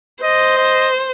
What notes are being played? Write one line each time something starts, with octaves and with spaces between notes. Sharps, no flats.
C5 D#5
D#5